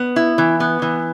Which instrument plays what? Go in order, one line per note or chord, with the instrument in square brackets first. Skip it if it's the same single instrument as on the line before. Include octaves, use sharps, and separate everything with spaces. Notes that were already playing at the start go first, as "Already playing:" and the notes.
Already playing: [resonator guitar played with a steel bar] B3
E4
E3
B3
E3